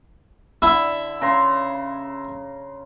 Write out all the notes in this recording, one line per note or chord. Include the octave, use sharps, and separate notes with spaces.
D3 E4
C#3 A#5 C6